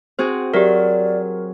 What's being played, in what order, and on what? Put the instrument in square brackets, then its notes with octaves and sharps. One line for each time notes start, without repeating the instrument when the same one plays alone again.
[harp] C4 F#4 G#4 [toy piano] C5
[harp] F#3 [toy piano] G4 E5 [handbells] A#4 [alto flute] D5